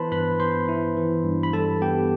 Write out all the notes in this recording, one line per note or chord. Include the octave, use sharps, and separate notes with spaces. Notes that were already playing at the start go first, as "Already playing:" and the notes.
Already playing: E3 B3 E4 B4 C5 A5 B5 C6
G2 B4 B5
B3 C5 C6
E4
E3
G2
B5
G3 A4 A5
B3 G4 G5